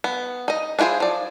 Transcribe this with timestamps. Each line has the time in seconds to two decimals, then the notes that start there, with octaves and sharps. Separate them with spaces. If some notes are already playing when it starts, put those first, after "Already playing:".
0.04 B3
0.48 D#4 D#5
0.79 D4 E4 F4 G#4 C5
1.00 F3 D5